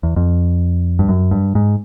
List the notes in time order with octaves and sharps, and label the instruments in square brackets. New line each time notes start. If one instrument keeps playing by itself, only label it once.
[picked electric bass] E2
F2
G2
F#2
G2
G#2